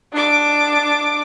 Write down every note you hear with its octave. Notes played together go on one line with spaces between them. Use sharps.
D4 D6